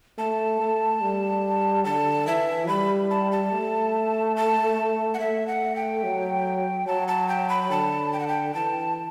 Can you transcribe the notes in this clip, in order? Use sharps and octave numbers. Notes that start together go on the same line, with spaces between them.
A3 A5
A3
G3
D3 A5
E3 E5
G3 B5
A5
A5
A3
A5
F#5
A3 E5
F#5
G5
F#3
F#3 A5
A5
G5
B5
D3 A5
G5
F#5
G5
E3 A5